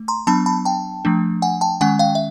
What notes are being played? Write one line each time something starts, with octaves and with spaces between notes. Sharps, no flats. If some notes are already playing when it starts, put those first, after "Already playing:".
Already playing: A3
A#5 C6
F#3 B3 D4 A5 B5
A5 B5
G5 A5
F3 A3 D4
F#5 G#5
G5 A5
D#3 G#3 C#4 F#5 G#5
F5 G5
E5